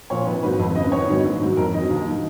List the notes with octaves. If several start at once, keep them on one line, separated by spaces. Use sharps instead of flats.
A#2 F3 C#5
G#1 B4
G#2 D#3 F#3 B4
F2 B4
C#3 F3 D#5
B4
G#1 C#5
G#2 D#3 F#3
A#1
G#2 F#3
F2 A#4
D#3 F#3 D#5
D#2
D#3 F#3